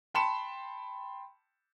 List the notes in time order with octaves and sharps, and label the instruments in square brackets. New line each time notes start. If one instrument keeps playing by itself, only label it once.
[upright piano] G5 A5 B5 C6 C#7 E7